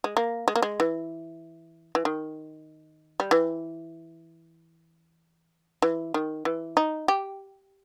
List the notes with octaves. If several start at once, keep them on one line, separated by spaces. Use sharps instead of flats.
G#3
A#3
G#3
A#3
G#3
E3
E3
D#3
G3
E3
E3
D#3
E3
D#4
G4